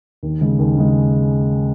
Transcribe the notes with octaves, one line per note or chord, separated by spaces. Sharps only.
D#2
C#3 G#3
D#2
C#3 G#3